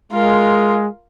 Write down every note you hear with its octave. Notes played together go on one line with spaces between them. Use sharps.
G#3 F4 A#4